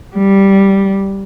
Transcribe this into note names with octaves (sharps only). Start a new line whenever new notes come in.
G3